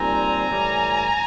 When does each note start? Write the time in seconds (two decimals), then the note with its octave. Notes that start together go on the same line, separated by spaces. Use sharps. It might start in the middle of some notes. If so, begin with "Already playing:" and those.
Already playing: A#2 G3 C4 D#4 G#5 A#5
0.48 A2 E3 G3